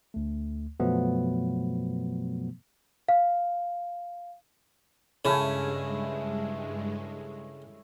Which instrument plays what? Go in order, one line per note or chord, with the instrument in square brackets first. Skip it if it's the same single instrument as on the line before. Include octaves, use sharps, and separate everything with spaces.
[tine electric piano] D2 A3
F#2 B2 F3 F#3 A3 B3
[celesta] F5
[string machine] G2 G#3 [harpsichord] C#3 [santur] A3 C#4 E4